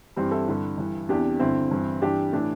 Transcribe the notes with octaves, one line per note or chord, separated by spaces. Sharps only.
G2 E3 G3 C4
E4 A4
G2 D3
G2 E3
E2 C3 E3 D4 G4
G2 D3 C4 E4
G2 E3
G2 E3 D4 G4
A2 E3 A3 D4